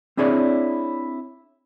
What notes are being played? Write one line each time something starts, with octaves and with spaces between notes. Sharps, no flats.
C4 D4 E4 G#4 C#5 D5